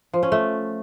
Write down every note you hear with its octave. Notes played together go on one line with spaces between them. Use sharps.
F3
C#4
A3